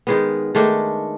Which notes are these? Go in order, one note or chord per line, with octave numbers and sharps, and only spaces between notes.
D#3 G#3 B3
D#3 G#3 A3 D4